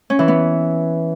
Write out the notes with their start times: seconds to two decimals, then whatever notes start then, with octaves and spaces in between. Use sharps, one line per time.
0.10 C#4
0.19 E3
0.28 B3